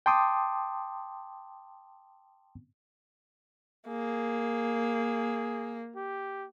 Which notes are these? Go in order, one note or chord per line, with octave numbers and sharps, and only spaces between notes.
G5 A5 C6 D6 D#6
A#3 G#4
G4